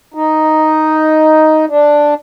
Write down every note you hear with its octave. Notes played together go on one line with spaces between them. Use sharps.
D#4
D4